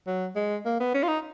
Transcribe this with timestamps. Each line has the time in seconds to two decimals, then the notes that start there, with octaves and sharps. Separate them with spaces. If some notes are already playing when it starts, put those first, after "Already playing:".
0.07 F#3
0.36 G#3
0.65 A#3
0.80 B3
0.94 C#4
1.03 F4
1.08 D#4